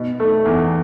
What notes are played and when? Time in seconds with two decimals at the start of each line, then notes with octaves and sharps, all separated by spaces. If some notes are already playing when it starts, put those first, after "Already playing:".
Already playing: B2
0.20 A3
0.45 E2